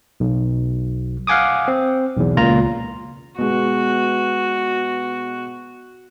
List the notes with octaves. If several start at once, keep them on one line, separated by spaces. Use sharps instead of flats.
B1
F5 F#5 G#5 D6 D#6
C4
B1 E2
C#2 A#2 F4 A#5
B2 G#3 F#4